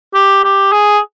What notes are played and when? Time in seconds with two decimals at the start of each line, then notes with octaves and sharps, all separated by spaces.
0.14 G4
0.44 G4
0.72 G#4